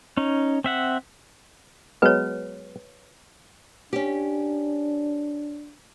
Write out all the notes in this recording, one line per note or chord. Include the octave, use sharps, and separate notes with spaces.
C#4 D#4
C4 E5 F#5
F#3 G#3 B3 B4 C#5
C#4 D4 G4